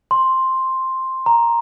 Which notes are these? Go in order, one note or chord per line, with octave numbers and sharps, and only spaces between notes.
C6
A#5